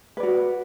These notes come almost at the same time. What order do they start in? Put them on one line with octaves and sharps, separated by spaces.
B4 D5 F#4